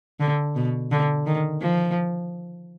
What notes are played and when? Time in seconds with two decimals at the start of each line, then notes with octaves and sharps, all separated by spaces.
0.20 D3
0.56 B2
0.92 D3
1.26 D#3
1.61 F3